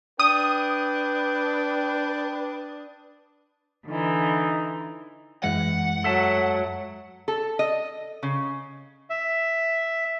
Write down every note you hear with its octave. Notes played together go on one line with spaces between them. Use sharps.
D4 B4 G5 D#6
D3 E3 D#4
F#2 E3 G#3 F#5
F#3 A4 E5 A5
A4
D#5
C#3
E5